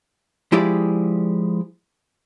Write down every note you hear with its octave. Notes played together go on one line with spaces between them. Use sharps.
F3 G#3 E4 G4 G#4 D5